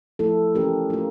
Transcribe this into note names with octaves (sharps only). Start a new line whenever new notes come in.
F3 A3 E4 A4
E3 A#3 C#4 G4 A#4
A3 C#4 F4 A#4